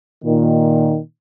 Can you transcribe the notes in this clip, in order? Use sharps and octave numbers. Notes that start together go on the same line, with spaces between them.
A#2 D#3